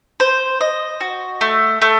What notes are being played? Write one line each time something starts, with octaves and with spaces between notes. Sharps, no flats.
C5
D#5
F#4
A3
A3